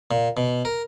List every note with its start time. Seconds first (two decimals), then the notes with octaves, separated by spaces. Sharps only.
0.11 A#2
0.37 B2
0.65 A#4